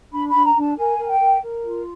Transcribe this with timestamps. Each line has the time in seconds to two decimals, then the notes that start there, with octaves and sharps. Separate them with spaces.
0.12 D4 B5
0.28 B5
0.34 D4
0.45 A#5
0.56 D4 A5
0.77 A#4 G#5
0.98 A#4
1.08 G5
1.19 A#4
1.41 A#4
1.62 F4